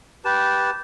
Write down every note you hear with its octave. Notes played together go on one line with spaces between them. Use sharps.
G4 B4 A5